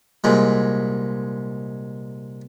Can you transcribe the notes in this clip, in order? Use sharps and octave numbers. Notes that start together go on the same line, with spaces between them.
C2 A#2 G#3